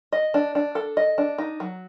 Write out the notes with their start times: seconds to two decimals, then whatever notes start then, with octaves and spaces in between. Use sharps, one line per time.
0.12 D#5
0.34 D4
0.55 D4
0.75 A4
0.97 D#5
1.18 D4
1.38 D#4
1.60 F#3